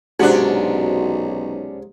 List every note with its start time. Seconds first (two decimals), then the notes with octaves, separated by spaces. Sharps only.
0.20 B1 G#2 C3 C#4 D4 F#4